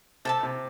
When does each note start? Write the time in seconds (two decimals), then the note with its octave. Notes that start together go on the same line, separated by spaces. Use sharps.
0.25 C3 A4 E5 A5
0.43 C3